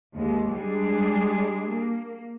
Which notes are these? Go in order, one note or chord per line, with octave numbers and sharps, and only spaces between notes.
D#2 G#3
G3 G#3 D4 G#4
A#3